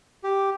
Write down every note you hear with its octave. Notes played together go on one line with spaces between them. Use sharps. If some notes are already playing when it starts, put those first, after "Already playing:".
G4